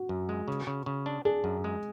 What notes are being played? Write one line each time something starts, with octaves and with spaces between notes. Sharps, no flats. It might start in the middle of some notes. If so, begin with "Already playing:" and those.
Already playing: F#4
F#2
G#3
C#3
C#3
C#3
D4
D4 G#4
F#2
G#3